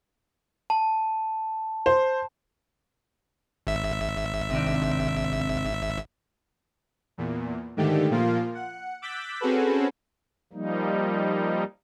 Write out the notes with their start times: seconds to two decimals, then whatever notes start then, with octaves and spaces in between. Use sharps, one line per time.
0.70 A5
1.86 C5
3.67 G#1 E5
4.51 C3 D#3 D4
7.18 E2 A#2
7.76 G#2 D3 D#3 A3 G4
8.10 A#2 F3 A#3 F4
8.55 F#5
9.02 D6 E6 F#6 G6 A6 B6
9.41 C4 C#4 F#4 G#4 A4 B4
10.53 F3 G3 A#3 D#4